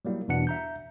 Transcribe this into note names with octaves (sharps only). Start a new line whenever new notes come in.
F#3 G3 A#3 E4
E2 B2 E3 D4 F#5 C#7
E5 A#5 G6